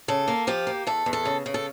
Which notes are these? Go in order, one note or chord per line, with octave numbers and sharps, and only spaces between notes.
C#3 A4
A#3
F3 G4
A#3
E2 A4
E2
A4
C#3
C#3
A4